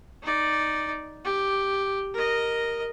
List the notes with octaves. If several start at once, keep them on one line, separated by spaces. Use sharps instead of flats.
D#4 D5
G4
A#4 D#5